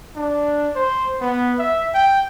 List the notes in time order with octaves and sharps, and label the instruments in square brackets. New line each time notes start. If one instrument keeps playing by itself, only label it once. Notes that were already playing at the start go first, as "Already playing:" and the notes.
[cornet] D4
C5
B3
E5
G5